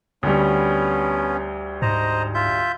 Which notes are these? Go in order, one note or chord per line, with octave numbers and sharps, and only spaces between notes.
D2 G3 B3 C#4
G#2 C5 D#5 A#5
F4 E5 G6